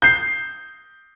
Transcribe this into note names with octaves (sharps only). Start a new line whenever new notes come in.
G6 C7